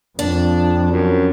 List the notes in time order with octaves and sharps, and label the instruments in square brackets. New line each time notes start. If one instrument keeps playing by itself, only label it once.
[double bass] F2 [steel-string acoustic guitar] D4
[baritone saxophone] F#2